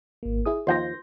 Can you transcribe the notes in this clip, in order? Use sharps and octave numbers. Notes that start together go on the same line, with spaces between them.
G#1 A#3
E4 G#4 D#6
D#2 F3 C6 G6 A#6